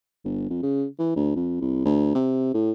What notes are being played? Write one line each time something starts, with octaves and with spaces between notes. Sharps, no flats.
G1
F2
C#3
E3
D2
F2
C2
D2
C3
A2